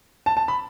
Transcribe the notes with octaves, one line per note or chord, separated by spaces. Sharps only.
A5
A5
B5